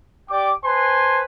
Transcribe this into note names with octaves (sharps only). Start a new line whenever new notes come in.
G4 D5 G5 D6
B4 C5 G#5 A5 C6